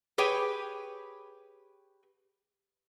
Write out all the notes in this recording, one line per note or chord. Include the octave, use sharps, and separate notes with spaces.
G4 G#4 B4 C#5 G5